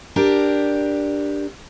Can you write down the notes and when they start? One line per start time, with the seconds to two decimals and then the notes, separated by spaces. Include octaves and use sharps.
0.16 D4 G4 A#4